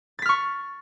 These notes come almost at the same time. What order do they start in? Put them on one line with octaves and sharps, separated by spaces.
A6 B6 F6 C#6